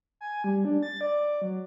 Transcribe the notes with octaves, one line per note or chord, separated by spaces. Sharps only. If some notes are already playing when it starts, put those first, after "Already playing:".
G#5
G3
D4
A6
D5
F#3